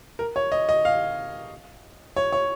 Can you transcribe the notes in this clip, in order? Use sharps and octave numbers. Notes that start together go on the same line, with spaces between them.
A#4
C#5
D#5
D#5
F5
C#5
C#5